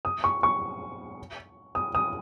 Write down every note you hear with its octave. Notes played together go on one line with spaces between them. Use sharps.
D#6
C#6
C#6
D#6
D#6